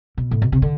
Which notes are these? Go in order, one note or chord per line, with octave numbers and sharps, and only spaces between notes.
B2
A2
B2
C3
D3